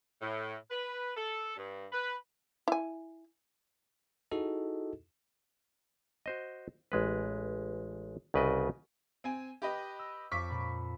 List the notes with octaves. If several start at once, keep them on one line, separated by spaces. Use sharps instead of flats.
A2
B4
A4
G2
B4
E4 G#5
D#4 E4 F#4 G#4 A4 D#5
F#4 C5 D#5
A1 G#3 B4
C2 C#3 B4 D5 D#5
C4 G#5
G4 B4 D#5
E6
F2 C#6 D6 B6
A#2 B5